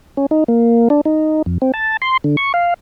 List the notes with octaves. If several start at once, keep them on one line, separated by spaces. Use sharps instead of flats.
C#4
D#4
A#3
D4
D#4
F2
C4
A5
C6
D3
C#6
F5